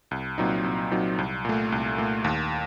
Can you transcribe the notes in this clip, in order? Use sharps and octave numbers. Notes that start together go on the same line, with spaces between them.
C2
A#2 F#3 C4 D#4
C2
A#2 F#3 C4 D#4
C2
A#2 A3
C2
A#2 A3
D#2